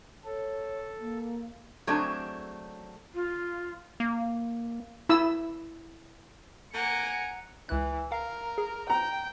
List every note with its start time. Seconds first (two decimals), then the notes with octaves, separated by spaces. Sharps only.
0.25 A4 C#5
1.00 A#3
1.87 F#3 A3 C4 D4 G#4
3.14 F4
4.00 A#3
5.09 E4 E6
6.74 A#3 F#5 G#5 A#5 C#7 D7
7.69 C#2 E3 F#6
8.12 A#4 F5
8.58 G#4
8.90 G5 A#5